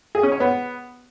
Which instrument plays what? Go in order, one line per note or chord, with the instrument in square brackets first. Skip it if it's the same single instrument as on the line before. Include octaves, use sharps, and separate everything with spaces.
[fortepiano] G#4
C#4
C#5
B3